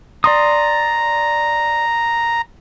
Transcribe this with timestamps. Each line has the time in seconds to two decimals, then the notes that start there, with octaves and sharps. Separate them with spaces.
0.24 D5 A#5 C6 D#6